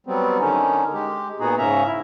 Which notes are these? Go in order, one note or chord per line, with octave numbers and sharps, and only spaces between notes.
F#3 G3 B3 C4
D3 D#3 C#4 D#4
G#3 G4
A#2 B3 D#4 F#4 G#4
G#2 C#3 C#4 E5 A#5
E4